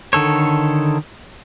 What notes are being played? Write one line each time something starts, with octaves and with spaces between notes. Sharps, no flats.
D3 D#3 A4 C#5